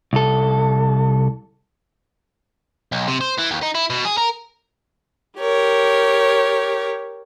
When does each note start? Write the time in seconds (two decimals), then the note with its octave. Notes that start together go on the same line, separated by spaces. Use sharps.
0.13 C2 A4
2.92 B1
3.08 C3
3.21 C5
3.38 E3
3.51 D#2
3.62 D#4
3.75 E4
3.90 B2
4.05 G#4
4.17 A#4
5.38 G4 A#4 C#5